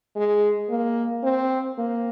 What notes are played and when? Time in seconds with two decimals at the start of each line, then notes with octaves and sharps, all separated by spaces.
0.16 G#3
0.70 A#3
1.23 C4
1.78 A#3